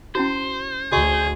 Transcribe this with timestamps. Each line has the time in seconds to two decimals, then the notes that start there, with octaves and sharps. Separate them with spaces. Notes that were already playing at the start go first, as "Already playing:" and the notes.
0.15 C#4 E4 F#4 C5
0.92 D2 F#4 G#4 D#5 C#6